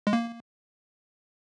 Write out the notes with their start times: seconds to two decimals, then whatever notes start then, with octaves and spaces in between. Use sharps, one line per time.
0.07 G#3
0.13 A#3